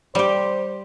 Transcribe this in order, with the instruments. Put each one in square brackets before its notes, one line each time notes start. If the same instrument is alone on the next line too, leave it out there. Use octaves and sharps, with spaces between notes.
[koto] G3 G4 [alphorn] C5